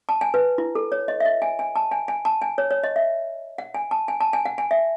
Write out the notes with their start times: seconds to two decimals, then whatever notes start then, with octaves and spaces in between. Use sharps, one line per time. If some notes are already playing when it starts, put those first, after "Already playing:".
0.09 A5
0.21 G#5
0.34 B4
0.58 E4
0.75 A4
0.92 C#5
1.08 D#5
1.20 E5
1.25 D#5
1.42 G#5
1.59 G#5
1.76 A5
1.92 G#5
2.08 G#5
2.25 A5
2.42 G#5
2.58 C#5
2.71 C#5
2.84 D#5
2.96 E5
3.58 F#5
3.75 G#5
3.91 A5
4.08 G#5
4.21 A5
4.33 G#5
4.45 F#5
4.58 G#5
4.71 E5